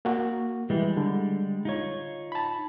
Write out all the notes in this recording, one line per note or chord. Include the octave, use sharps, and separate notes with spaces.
A#3 F#4
E3 G3 G#3
D3
D#4 F4 C#5
A5 B5